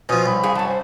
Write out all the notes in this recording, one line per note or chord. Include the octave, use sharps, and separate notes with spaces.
B2 F3 C#4 D#6
C2 B5
F2 G#4
F#2 C#4 A5
C5